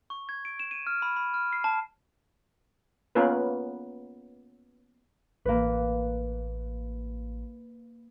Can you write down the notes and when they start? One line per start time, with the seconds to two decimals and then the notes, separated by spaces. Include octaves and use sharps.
0.10 C#6
0.29 G#6
0.45 D7
0.60 E7
0.71 D#7
0.87 F6
1.02 B5
1.16 B5
1.34 F6
1.53 C7
1.64 A5
3.15 A#3 B3 C#4 F4 A#4 B4
5.45 A1 A#3 B4